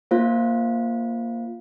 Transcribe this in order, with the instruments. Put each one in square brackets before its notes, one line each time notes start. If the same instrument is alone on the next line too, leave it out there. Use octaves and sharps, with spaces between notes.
[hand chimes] A#3 F4 C5 F5